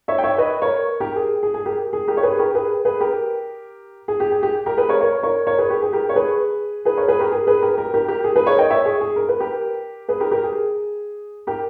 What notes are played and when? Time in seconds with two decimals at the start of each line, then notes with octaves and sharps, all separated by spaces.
0.08 C#5 E5
0.18 G5
0.23 C#5 E5
0.38 B4 D#5
0.62 A#4 C#5
1.00 G4 A#4
1.16 G#4
1.43 G#4
1.54 G#4
1.66 G4 A#4
1.93 G#4
2.08 G4 A#4
2.17 C#5
2.23 G#4 B4
2.39 G4 A#4
2.55 G#4 B4
2.85 G#4 B4
3.00 G4 A#4
4.08 G#4
4.20 G4
4.32 G#4
4.43 G4
4.66 G4 A#4
4.77 G#4 B4
4.89 A#4 C#5
5.01 A#4 C#5
5.23 A#4 C#5
5.47 A#4 C#5
5.58 G#4 B4
5.70 G4
5.82 G#4
5.93 G4 A#4
6.09 C#5
6.16 G#4 B4
6.85 G#4 B4
6.97 A#4 C#5
7.08 G#4 B4
7.20 G4 A#4
7.32 G#4
7.47 G#4 B4
7.62 G4 A#4
7.77 G4 A#4
7.94 G4 A#4
8.08 G4 A#4
8.24 G#4
8.36 G#4 B4
8.47 A#4 C#5
8.59 D#5 G5
8.70 C#5 E5
8.85 G#4
9.01 G#4
9.16 A#4
9.29 B4
9.40 G4 A#4
10.09 G#4 B4
10.20 G4 A#4
10.31 G4 A#4
10.44 G#4
11.47 G4 A#4